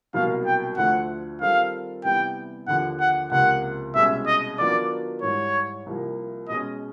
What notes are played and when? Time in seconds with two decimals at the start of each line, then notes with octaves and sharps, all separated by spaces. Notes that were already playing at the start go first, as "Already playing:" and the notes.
0.14 C2 B2 F#3 A#3 F5
0.46 G5
0.77 D2 D3 F3 A3 F#5
1.41 D#3 G3 C4 F4 A4 F5
2.04 C3 E3 G3 B3 G5
2.68 D#2 D3 F3 F#5
3.00 F#5
3.31 C#2 C3 F3 A#3 F#5
3.95 C2 B2 G#3 C#4 E5
4.27 D#5
4.58 D#3 F#3 B3 D4 F4 D5
5.22 G#2 E3 G3 C#5
5.86 C2 C3 F3 A#3
6.49 B2 G#3 C#4 D#5